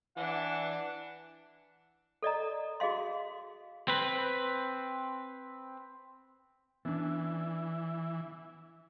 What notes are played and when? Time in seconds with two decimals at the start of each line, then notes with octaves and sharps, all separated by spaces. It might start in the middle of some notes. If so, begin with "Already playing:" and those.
0.17 E3 D4 F#5 A5
2.23 A4 D5 D#5 A#5
2.80 F#4 G#4 D#5 F5 C6
3.88 C4 B4
6.85 E3 B3 C#4 D4